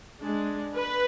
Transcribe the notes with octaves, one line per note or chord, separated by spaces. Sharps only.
G#3 D4
B4